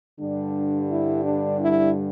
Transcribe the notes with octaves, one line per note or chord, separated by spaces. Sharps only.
G2 D3 G3 D4
E4
D4
E4